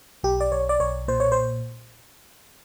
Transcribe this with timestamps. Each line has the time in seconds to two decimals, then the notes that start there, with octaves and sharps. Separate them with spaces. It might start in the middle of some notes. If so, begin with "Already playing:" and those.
0.24 B1 G4
0.41 D5
0.52 B1 C#5
0.69 D5
0.80 B1 C#5
1.08 A#2 C5
1.20 C#5
1.32 C5